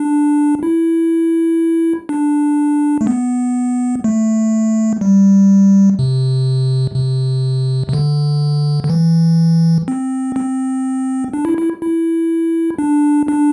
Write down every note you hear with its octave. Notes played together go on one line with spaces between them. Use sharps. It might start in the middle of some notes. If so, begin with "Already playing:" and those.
Already playing: D4
E4
D4
A3
B3
A3
G3
C3
C3
C3
D3
D3
E3
C4
C4
D4
E4
E4
E4
D4
D4